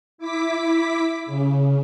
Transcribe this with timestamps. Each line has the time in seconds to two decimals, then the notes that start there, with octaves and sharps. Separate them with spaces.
0.18 E4 D6 B6
1.26 C#3